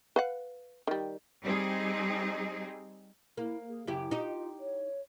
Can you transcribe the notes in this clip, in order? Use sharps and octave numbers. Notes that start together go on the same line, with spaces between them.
B4 F5 F#5
D#3 G3
G3 C4 D#4 G#4
A#3 E4
G#4
F#2 C#3 E4 G4
D#4 F4 G4
C#5